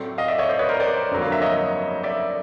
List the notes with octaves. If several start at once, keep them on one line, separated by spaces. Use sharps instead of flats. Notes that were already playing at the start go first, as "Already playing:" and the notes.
Already playing: A2 F#3 A3 C4 D5
D#5 F5
D5 E5
C#5 D#5
C5 D5
B4 C#5
A#4 C5
C5 D5
G1 F2 D3 F#3 A#3
F5
E5
C#5 D#5
D5 E5